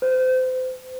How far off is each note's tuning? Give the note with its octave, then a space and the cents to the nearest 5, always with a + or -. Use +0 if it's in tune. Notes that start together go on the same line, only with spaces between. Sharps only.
C5 -30